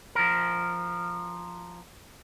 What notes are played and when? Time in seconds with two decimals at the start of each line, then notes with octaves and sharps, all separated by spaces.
0.15 F3 A#4